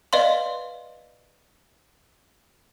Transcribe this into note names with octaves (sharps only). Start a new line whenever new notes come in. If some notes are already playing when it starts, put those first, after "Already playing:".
B4 D5 D#5 F5 C6